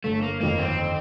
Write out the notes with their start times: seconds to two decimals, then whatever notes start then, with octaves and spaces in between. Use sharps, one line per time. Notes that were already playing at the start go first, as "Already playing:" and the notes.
0.04 G1 A3
0.23 A#3
0.41 F2 D#3 A#3
0.59 C4